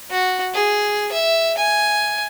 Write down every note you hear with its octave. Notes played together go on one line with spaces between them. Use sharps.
F#4
G#4
E5
G#5